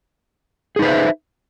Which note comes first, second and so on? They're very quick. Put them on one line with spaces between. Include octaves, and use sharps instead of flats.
G#4 D#4 B4 C5 E5